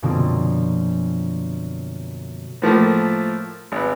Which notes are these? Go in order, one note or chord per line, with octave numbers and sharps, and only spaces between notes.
F#2 B2 D3 F3 A#3 C4
A2 F3 A3 A#3
G#1 B4